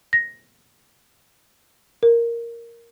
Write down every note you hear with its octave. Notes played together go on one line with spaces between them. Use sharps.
A#6
A#4